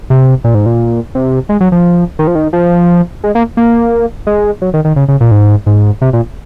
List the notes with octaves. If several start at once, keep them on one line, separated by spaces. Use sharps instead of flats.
C3
A#2
G#2
A#2
C3
G#3
F#3
F3
D#3
F3
D#3
F3
G#3
A#3
A#3
G#3
F#3
D#3
D#3
C#3
C#3
A#2
G#2
G#2
C3
A#2